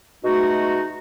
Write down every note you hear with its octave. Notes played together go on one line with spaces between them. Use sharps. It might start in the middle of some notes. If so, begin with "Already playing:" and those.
B2 G#3 A3 D#4 F#4